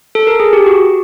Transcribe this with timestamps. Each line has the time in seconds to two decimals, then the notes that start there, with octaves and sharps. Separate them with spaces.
0.15 A4
0.27 A#4
0.40 G#4
0.53 G4
0.66 F#4